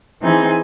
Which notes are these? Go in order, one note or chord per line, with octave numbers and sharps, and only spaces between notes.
E3 C4 D#4 G#4